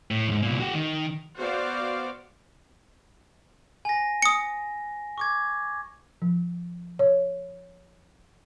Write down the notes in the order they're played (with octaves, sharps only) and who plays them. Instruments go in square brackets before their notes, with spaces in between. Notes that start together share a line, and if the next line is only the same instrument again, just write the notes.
[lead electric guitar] A2
D#2 G#2
C2 A#2
F#4 G4
D#3
[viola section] B3 F#4 C5 D5 F5
[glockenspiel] G#5 A#6
[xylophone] D#6 C#7
[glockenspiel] C#6 D6 G#6
[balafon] F3
C#5